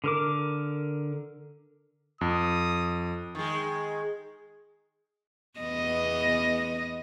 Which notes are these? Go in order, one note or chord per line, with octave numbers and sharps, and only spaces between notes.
D3 A#4 D6
F2 D#6
D#3 G#3
E2 B3 D#5